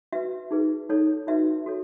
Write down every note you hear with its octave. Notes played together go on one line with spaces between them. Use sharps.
F#4 B4 E5
D#4 G#4 B4
D#4 A4 C#5
D#4 F#4 B4 E5
F#4 A4 C#5